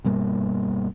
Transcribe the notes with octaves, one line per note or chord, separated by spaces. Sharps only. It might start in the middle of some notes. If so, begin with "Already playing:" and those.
G2 B2 G3 A#3